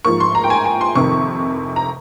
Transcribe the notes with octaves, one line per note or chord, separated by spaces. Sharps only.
G#2 F3 A#3 C#6
C6
A#5
G5
G#5
G#5
C6
F2 C3 D#3 C#6
A#5